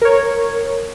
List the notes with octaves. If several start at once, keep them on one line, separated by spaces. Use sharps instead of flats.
A#4 C#5